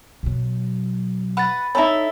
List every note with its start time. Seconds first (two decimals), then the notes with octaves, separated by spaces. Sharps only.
0.23 B2 F#3
1.37 B4 F#5 B5 A6
1.75 D#4 E4 A4 C#5 E5 A#5 B5